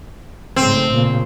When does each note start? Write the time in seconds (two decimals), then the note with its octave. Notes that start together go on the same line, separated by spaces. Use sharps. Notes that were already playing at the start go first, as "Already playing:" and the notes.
0.56 G#2 C#3 A3 C4
0.91 A#2 C#3 A#3